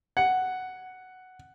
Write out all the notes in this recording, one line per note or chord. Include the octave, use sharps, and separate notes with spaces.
F#5